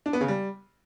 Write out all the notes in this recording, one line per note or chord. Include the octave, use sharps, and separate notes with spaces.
D4
B3
C#3
G3